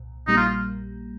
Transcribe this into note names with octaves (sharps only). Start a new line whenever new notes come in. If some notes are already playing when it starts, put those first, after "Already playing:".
Already playing: C2 A#2
A#1 A#2 G3 A#3 D#4
F4